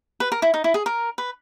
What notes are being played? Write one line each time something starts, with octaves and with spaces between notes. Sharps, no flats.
B4
A#4
E4
D#4
E4
G#4
A#4
B4